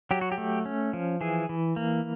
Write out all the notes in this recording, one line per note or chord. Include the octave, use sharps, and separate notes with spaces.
F#3 G4
F#4
G4
A3
C#4
F3
E3 G#4
E3
A#3